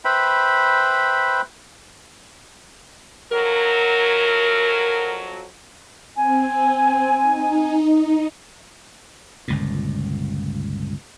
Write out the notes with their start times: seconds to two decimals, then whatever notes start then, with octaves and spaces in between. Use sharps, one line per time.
0.05 B4 C5 E5 G5 B5
3.32 F2 F#3 A#4
6.15 C4 G#5
7.21 D#4
9.48 G1 C#2 A#2